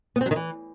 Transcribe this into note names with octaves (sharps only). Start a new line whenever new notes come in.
B3
C4
F#3
D#3
E3